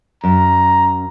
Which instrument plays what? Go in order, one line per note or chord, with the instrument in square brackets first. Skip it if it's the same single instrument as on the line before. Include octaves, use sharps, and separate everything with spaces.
[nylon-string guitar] F#2 [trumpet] A#5